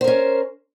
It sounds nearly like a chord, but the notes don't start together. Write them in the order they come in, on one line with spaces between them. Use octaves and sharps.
C5 A#4 C#4